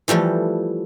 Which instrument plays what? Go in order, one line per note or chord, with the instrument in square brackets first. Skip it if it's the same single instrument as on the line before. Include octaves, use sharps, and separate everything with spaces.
[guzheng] E3 F3 G3 A3